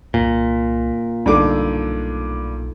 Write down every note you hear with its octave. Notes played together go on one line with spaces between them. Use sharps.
C2 A#2
B1 G2 D3 D#4 A4 D6